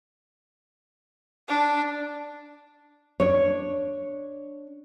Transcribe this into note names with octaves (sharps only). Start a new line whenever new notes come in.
D4
D4 C#5